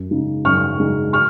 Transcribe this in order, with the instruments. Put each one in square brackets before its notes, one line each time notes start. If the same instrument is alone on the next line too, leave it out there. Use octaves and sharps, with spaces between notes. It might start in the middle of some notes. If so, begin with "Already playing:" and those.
Already playing: [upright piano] F#2
C#3 G#3 D#4
F#2 C#6 F6
C#3 G#3 D#4
C#6 F6